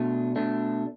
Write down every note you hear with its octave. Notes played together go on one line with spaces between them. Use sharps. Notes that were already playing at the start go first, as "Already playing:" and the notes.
Already playing: B2 A3 D4
B2 A3 D4